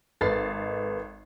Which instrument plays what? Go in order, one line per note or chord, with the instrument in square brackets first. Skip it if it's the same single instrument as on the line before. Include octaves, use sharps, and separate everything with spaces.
[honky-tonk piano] G#1 A6 C7 [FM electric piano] A4 B4 D#5